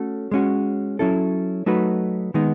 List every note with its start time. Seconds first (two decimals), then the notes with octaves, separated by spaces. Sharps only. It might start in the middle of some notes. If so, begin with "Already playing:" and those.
Already playing: A3 C#4 F#4 A4
0.31 G#3 C#4 F#4
0.99 F#3 C#4 E4 A4
1.66 F#3 A3 D#4 F#4 B4
2.34 D#3 G#3 B3 D#4